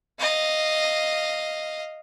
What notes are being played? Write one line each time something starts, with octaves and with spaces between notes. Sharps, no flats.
D#5 F5